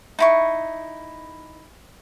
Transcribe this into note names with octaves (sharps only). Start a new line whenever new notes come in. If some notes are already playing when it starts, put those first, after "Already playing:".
D#4 E4 C#6